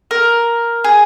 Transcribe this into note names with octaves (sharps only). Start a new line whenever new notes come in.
A#4
G#4